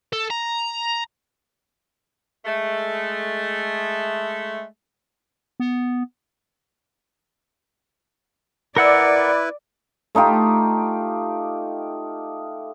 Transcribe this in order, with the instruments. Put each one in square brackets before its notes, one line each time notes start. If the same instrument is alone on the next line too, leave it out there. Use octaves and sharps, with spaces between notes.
[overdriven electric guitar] A4
A#5
[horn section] G#3 A3
[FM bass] B3
[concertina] E4 B4 [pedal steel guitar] A#4 F#5 E6 [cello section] D5
[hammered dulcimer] A3 D#4 F4 G4